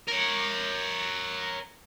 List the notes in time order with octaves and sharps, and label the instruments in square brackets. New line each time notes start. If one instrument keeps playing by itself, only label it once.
[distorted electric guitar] A#4 C#5